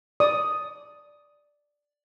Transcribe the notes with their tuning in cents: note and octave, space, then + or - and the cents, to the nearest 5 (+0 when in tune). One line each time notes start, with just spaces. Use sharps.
D5 +0 D#6 +0